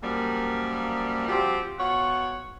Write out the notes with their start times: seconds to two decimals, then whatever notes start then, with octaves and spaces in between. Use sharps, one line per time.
0.03 F#2 F3 G3 A#3
1.29 F3 G3 C4 F#4 G4
1.79 B2 F4 C#5 F#5